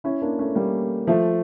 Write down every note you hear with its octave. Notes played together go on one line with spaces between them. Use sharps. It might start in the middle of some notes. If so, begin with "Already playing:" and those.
C#4 E4
A#3 D4
A3 C#4
G3 A#3
F3 A3